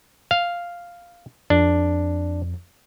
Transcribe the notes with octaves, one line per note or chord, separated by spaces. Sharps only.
F5
F2 D4